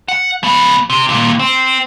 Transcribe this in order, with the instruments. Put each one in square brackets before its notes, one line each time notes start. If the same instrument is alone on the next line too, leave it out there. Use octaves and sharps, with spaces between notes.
[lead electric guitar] F#5
F3 B3
C3
D#2 A#2
C4